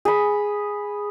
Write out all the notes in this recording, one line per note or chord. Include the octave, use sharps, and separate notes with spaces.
G#4 B5